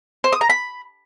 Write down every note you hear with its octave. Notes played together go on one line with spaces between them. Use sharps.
C5
D#6
A#5
B5